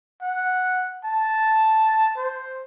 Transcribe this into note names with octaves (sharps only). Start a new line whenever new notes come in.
F#5
A5
C5